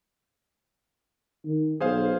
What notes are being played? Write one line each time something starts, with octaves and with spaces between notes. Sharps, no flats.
D#3
B1 G#4 C5 F5